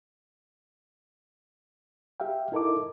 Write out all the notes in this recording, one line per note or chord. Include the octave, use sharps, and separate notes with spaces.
G4 E5 F5 G5
D#4 E4 A4 A#4 D#5 D6